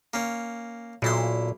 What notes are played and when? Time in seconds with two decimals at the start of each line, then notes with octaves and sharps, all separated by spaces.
0.14 A#3 C#4
1.02 B1 A#2 E4 C6